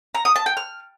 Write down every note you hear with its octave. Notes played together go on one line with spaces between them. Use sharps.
A#5
D#6
A5
G5
F6